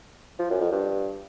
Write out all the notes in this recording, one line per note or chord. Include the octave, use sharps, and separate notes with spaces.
F3
F#2
F2
G2